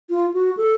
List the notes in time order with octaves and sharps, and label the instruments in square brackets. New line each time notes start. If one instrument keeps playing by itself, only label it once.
[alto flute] F4
F#4
A4